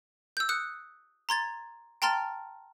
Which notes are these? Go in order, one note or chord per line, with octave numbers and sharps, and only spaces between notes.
E6 G6
D#6 F#6 C#7
A#5 C6 G#6 A6
G5 A5 A#5 C6 F6 A6